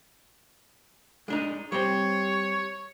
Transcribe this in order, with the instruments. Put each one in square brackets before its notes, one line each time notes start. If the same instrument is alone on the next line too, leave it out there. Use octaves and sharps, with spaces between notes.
[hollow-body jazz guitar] G#3 D4 D#4
[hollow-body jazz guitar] G3 C4 [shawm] C#5